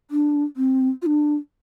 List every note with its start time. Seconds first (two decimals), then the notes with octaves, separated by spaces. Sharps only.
0.11 D4
0.57 C4
1.02 F4
1.06 D4